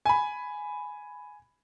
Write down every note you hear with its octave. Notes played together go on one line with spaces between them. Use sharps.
G#5 B5